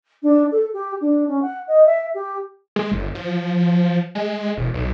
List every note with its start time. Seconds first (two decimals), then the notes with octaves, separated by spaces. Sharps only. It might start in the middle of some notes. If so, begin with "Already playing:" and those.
0.23 D4
0.51 A4
0.73 G4
1.01 D4
1.28 C#4
1.42 F#5
1.67 D#5
1.85 E5
2.14 G4
2.76 G#3
2.92 G1
3.15 F3
4.15 G#3
4.57 E1
4.74 B1